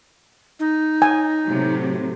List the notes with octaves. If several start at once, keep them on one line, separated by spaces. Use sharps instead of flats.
D#4
G#5
A2 C3 F#3